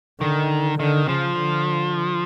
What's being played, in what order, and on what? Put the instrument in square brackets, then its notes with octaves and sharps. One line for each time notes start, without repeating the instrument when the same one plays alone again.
[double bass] D3 [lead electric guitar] D#3
[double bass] D3 [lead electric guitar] D#3
[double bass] C#3 [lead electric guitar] F3
[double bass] D3